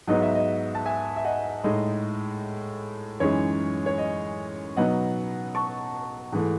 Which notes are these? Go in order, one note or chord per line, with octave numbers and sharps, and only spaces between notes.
G#2 F#3 B3 D#4 D#5
E5
D#5
A5
E5 G#5
E5
D#5 F#5
A2 G#3 D#4 D#5
F#2 E3 G#3 D#4 C#5
C#5
D#5
B2 F#3 B3 D#4 D#5 F#5
A5 C#6
G#2 E3 A3